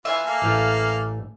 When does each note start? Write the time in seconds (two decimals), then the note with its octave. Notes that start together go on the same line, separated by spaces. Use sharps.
0.05 E3 F4 E5 F5 G#5
0.26 A#3 A4 F5
0.42 A1 E3 A3